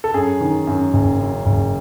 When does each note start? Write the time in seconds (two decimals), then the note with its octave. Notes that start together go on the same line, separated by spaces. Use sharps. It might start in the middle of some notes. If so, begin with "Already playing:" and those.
0.04 A4
0.14 F#2 G#4
0.41 D#3
0.67 F#2
0.93 F#1
1.19 F#2
1.46 F#1